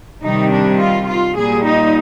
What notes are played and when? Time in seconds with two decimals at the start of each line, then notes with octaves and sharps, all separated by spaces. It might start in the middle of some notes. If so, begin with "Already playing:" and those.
0.23 C3 D#3 G3 D#4
0.52 D4
0.80 F4
1.08 F4
1.36 A#2 G3 G#4
1.65 D#4